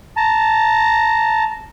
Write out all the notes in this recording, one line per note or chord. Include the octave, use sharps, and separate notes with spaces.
A5 A#5